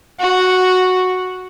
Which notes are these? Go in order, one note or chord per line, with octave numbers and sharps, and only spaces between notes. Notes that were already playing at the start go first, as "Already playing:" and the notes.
F#4